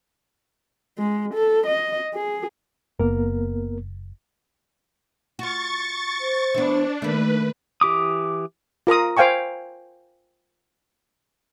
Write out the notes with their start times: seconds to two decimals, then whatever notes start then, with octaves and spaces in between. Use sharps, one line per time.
0.98 G#3
1.34 A4
1.67 D#5
2.14 G#4
3.00 F#1 A#3 B3 A#4
5.39 F4 F#4 C#6 A6
6.21 C5
6.54 E3 B3 D4
7.02 D#3 A3 A#3 B4
7.81 E3 G4 D6 D#6
8.87 F4 A#4 A#5 D#6
9.17 C5 F5 G5 G#5 C#6